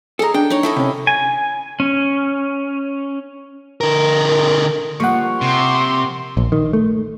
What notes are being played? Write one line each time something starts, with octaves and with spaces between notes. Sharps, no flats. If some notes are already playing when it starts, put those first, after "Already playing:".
G#4 A4 D#5 A#5
D4 G5
D#4 C#5
E4 A4 D#5
C3 C#4
G#5
C#4
D3 A#4
F3 G3 A#3 F#5 C#6
C3 C6
A#1
D#3
A3